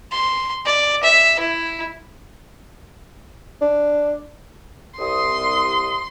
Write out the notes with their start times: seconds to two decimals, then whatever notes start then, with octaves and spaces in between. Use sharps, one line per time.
0.12 C6
0.66 D5
1.03 E5
1.40 E4
3.61 D4
4.99 C2 C6 D#6